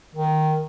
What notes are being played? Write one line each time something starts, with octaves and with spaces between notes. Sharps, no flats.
D#3